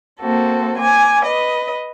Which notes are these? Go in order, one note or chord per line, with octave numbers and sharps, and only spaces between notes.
A#3 C4 F#4 A4
G#5 D6
B4 D#5